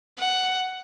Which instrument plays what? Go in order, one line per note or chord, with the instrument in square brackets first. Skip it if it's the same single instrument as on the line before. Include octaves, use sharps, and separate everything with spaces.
[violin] F#5